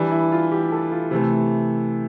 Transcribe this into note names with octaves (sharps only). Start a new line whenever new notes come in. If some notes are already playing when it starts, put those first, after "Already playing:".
Already playing: E3 G3 D4
E4
F4
G4
A4
F4
C3 E3 A3